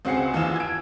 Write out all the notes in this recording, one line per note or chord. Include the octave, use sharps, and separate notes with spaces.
C#2 C4 F#4 G#4 C7 C#7
D#2 E3 F4 G#5 E6 E7
G#6 D7